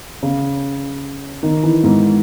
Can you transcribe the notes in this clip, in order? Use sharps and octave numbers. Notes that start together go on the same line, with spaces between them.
C#3
D#3
E3
G#2